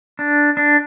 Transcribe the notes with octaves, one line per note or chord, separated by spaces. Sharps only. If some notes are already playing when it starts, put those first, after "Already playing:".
D4
D4